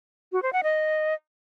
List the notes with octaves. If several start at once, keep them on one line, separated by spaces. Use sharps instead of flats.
F#4
C5
F#5
D#5